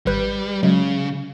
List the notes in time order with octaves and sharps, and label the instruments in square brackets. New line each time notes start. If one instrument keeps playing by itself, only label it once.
[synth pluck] G#1 B4 G6 [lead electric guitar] G3
[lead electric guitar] C#3 [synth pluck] F#3 G#3